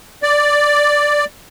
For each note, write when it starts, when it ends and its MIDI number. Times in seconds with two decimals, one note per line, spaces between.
0.23 1.25 74